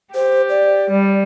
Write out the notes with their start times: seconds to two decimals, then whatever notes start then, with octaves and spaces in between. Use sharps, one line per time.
0.15 G4 C5
0.50 D5
0.90 G3